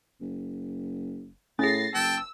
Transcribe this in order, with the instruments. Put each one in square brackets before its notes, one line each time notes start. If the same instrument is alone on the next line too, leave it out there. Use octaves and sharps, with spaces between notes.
[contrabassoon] F#1
[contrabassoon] A2 [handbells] C#4 G#4 [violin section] A6 A#6 C7
[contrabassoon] F#1 [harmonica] G5 A5 [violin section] E6